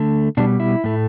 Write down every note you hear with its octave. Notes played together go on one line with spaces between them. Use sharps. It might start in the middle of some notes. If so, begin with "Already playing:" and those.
Already playing: D3 A3
B2 G3 D4
E4
A2 A3